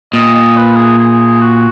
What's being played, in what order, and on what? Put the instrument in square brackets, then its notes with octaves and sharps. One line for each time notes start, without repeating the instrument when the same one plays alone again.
[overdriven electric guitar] A#2 [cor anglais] D#5
[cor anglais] D#5
B4
G#4
G#4
F#4